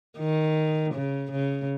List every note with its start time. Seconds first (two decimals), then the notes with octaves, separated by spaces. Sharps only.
0.19 D#3
0.94 C#3
1.32 C#3